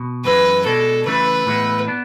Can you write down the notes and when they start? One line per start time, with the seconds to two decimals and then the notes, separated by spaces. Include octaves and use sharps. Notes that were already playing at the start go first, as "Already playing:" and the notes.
Already playing: B2
0.25 F#2 E3 G#3 B4
0.66 B2 G#3 D4 A4
1.06 C#3 E3 A3 E4 B4
1.47 A2 E3 G#3 B3 E4
1.88 B3 D4